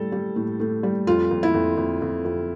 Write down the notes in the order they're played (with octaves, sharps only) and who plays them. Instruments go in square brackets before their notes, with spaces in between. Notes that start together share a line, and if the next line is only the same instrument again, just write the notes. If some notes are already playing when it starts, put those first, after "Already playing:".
Already playing: [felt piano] A2 G3 A4
G3
A2
A2
G3
F2 F4
F2
E4
F2
F2
F2
F2